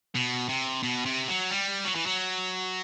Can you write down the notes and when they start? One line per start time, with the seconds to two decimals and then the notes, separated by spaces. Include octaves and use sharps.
0.15 B2
0.49 C3
0.83 B2
1.05 C3
1.28 F#3
1.51 G3
1.84 F#3
1.95 E3
2.06 F#3